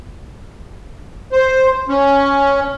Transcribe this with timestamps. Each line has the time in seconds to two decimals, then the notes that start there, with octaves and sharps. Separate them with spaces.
1.32 C5
1.88 C#4